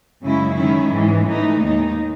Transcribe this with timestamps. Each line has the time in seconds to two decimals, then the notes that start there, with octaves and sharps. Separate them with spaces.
0.21 F#2 C#3 G#3 C#4 E4
0.56 D#3 G#3 C#4 E4
0.92 G#2 E3 G#3
1.27 A2 E3 A3 D#4
1.62 D#2 D#3 G#3 D#4